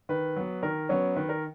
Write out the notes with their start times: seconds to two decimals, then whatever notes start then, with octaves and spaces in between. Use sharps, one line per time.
0.09 D#3 B4
0.36 F#3 B3
0.63 D#3 A#4
0.89 F#3 B3 C#4
1.16 D#3 B4
1.29 A#4